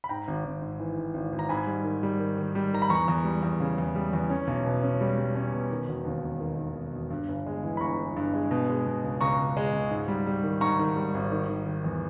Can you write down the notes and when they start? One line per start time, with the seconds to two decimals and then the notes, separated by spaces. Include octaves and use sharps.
0.04 B5
0.09 G#2 G5 A#5
0.28 G#1
0.45 G#1
0.62 G#2
0.79 E3
0.98 G#2
1.14 G#1
1.33 G#1
1.39 A#5
1.49 G#2 G#5 B5
1.67 G3
1.84 D#3
2.03 G3
2.20 D#3
2.38 D#3
2.55 G3
2.73 D#3 A#5
2.82 B5
2.89 E2 A#5 C#6
3.08 E2
3.24 G3
3.43 E2
3.60 C#3
3.78 E2
3.95 G3
4.13 E2
4.30 C#4
4.47 B1
4.66 B2
4.83 C#4
5.01 G3
5.18 G3
5.35 C#4
5.53 B2
5.71 D#3
5.89 E1
6.05 D#2
6.24 E1
6.40 D#3
6.58 D#3
6.76 E1
6.92 E1
7.10 G2
7.28 G1
7.46 G#3
7.63 E3
7.77 B5
7.80 G1 A#5 C#6
7.98 E3
8.16 G2
8.33 G#3
8.51 B2
8.69 G#3
8.86 B2
9.04 C#2
9.20 C#2 A#5 C#6
9.39 C#2
9.57 G#3
9.73 C#2
9.90 G#2
10.08 G3
10.27 G3
10.43 D#3
10.61 G#2 A#5 C#6
10.79 D#3
10.96 G3
11.14 G#1
11.32 D#3
11.49 D#3
11.66 D#3
11.84 E2